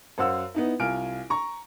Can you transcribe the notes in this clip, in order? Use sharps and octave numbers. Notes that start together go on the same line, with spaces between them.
F#2 C5 F5 F#5 E6
B3 D#4 E4
C2 F4 G#5 F6 D7
A#5 C#6